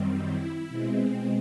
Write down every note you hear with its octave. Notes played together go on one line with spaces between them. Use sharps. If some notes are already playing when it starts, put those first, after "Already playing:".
Already playing: F#2 D#3 G3 C4
E4
B2 G#3 C4